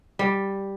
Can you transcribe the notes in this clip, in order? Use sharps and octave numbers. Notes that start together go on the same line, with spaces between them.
G3